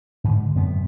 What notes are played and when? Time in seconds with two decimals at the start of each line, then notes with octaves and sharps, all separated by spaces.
0.24 G#2 D3
0.55 F#2 C3 B3